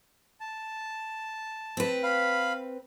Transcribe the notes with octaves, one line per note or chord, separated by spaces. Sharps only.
A5
C4 B4
F5 B5